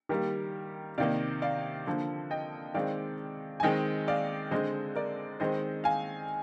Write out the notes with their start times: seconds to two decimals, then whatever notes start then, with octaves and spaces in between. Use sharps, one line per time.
0.09 D#3 G3 A#3 G4 A#4
0.98 C3 D#3 A#3 D5 F5
1.42 D5 F5
1.87 D3 F3 A#3
2.31 D#5 G5
2.74 D#3 G#3 C4 D5 F5
3.60 G#5
3.63 D#3 G#3 C4 D#5 G5
4.08 D5 F5
4.51 D3 G#3 C4 C5 D#5
4.95 A#4 D5
5.40 D#3 G#3 C4 C5 D#5
5.84 F5 G#5